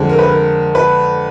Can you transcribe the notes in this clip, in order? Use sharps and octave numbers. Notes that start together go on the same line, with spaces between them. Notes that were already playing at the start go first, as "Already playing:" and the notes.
Already playing: F2 D3 G#3
A#4
B4
A#4
B4